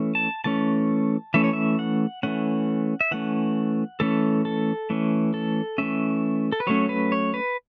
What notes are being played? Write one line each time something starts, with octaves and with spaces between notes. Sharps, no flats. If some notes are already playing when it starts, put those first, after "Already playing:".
Already playing: E3 A3 C#4
A5
E3 A3 C#4 A5
E3 A3 C#4 E5
C#5
E5
F#5
E3 A3 C#4 F#5
E5
E3 A3 C#4 F#5
E3 A3 C#4 A4
A4
E3 A3 C#4
A4
E3 A3 C#4 E5
A4
B4
F#3 A3 C#4 C#5
B4
C#5
B4